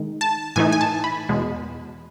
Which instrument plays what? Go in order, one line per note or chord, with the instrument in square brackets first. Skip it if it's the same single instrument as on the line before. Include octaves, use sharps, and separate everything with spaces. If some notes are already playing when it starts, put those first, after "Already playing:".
Already playing: [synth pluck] D#3 G#3 D#4
A5
A2 E3 A3 D#4 G#5
G#5
A5
B5
E2 B2 G#3